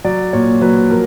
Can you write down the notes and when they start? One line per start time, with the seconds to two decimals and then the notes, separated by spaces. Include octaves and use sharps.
0.05 F#3 D5
0.33 A#2 C#5
0.61 F#3 B4
0.90 F3 A#4